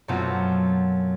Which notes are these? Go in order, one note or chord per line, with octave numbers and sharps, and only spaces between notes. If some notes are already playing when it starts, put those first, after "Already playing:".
F#2 B2 A3 C4 F4 F#4